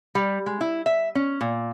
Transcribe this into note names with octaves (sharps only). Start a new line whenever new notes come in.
G3
G#3
E4
E5
C#4
A#2